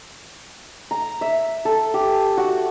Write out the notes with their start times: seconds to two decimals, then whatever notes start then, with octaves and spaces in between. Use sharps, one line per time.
0.91 A#5
1.21 E5
1.65 A4
1.94 G4
2.37 F#4